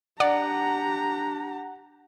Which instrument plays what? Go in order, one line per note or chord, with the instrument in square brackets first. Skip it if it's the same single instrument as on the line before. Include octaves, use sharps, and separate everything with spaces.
[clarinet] D4 [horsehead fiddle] G4 A#5 [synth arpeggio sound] D5 [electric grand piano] F#5